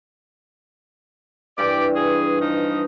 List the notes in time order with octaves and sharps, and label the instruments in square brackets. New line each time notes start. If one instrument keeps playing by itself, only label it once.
[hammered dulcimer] G2 E3 [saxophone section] G4 D5
[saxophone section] G#4
F3 D#4